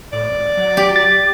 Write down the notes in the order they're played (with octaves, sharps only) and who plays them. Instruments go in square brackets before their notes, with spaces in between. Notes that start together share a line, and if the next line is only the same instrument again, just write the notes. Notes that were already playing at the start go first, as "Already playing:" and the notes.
[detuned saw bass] A2 [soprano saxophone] D5
[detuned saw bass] G#1
F#3
[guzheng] G4
[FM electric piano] A6